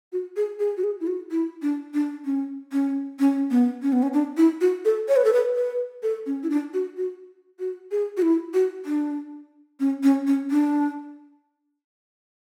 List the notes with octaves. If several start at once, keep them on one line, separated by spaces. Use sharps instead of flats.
F#4
G#4
G#4
F#4
G#4
E4
F#4
E4
D4
D4
C#4
C#4
C#4
B3
C#4
B3
C#4
D4
E4
F#4
A4
C#5
B4
A4
B4
B4
A4
C#4
E4
D4
F#4
F#4
F#4
G#4
F#4
E4
F#4
D4
C#4
C#4
C#4
D4